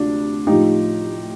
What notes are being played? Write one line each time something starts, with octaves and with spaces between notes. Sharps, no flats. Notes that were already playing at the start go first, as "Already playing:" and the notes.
Already playing: D2 C3 D4 F4
A2 F3 D#4 G4